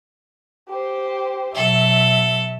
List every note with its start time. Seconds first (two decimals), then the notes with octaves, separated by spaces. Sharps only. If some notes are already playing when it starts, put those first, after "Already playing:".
0.69 G4 C5
1.55 B2 F#3 A4 E5